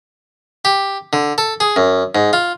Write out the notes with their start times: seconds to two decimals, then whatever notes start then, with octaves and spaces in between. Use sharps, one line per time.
0.65 G4
1.13 D3
1.38 A4
1.60 G#4
1.76 F#2
2.15 G#2
2.33 F4